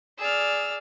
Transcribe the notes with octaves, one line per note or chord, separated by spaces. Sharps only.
G#4 D5 E6 F6